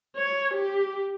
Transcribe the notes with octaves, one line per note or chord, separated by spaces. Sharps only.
C#5
G4